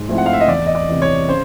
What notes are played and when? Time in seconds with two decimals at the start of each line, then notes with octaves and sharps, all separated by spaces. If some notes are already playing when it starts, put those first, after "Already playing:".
Already playing: G#2
0.08 F3 A3 C4 E4
0.18 F#5
0.26 F5
0.33 E5
0.40 D#5
0.48 E2 D5
0.66 D#5
0.75 D5
0.89 C3 E3
1.02 C#5
1.29 C#3 C5